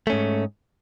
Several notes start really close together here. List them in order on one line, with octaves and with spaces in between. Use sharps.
A3 C#4 G#2